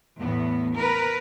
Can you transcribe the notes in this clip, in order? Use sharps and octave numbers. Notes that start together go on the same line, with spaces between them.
E2 A2 B3
A#4 B4